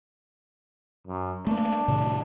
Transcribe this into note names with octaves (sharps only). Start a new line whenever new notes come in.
F#2
A3 A#3 D4
A2 C3 D#3